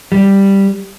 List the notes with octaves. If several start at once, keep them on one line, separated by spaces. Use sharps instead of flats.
G3